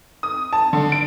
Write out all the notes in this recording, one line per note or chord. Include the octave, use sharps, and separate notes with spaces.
D#6
A5
D3
D7